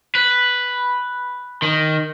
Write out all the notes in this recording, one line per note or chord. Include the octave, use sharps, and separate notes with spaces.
B4
D#3